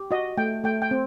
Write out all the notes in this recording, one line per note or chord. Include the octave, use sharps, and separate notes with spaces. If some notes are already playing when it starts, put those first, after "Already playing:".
Already playing: G4
F#4 D#5
A3 G5
A3 G5
G5
C4